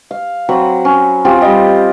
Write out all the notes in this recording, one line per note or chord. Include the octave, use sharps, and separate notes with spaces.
F5
F#3 C4 B5
C#4
C4 F4 G4 G#4
G3 D#5